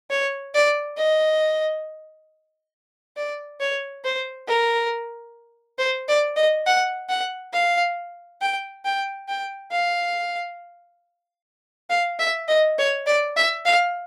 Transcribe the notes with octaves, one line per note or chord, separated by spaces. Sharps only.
C#5
D5
D#5
D5
C#5
C5
A#4
C5
D5
D#5
F#5
F#5
F5
G5
G5
G5
F5
F5
E5
D#5
C#5
D5
E5
F5